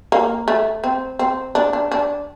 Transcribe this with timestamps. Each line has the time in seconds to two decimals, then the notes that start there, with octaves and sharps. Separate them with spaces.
0.12 A#3
0.48 A3
0.84 C4
1.19 C4
1.55 D4
1.73 D4
1.92 D4